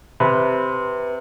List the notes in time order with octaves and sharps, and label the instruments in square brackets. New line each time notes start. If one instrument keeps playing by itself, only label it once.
[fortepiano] C3 [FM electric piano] B4